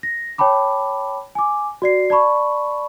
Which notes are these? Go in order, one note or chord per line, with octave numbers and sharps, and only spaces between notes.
A#6
C#5 G5 A5 B5 D6
G#5 D6
F#4 D5 C7
D5 A5 B5 C#6